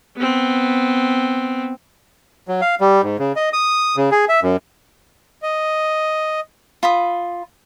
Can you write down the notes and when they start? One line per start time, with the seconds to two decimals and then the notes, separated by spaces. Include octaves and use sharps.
0.17 B3 C4
2.48 F#3
2.61 F5
2.81 G3
3.03 G#2
3.19 C#3
3.36 D#5
3.53 D#6
3.96 C#3
4.11 G#4
4.29 E5
4.43 F#2
5.43 D#5
6.83 F4 B5 D#6